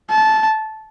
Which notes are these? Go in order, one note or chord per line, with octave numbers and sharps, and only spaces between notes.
A5